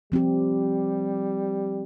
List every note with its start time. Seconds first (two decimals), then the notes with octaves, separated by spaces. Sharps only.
0.12 F3 G3 C4 G4